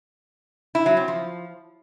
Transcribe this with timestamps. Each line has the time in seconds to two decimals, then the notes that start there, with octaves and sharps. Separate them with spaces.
0.75 E4
0.86 F#3
0.97 C4
1.08 F3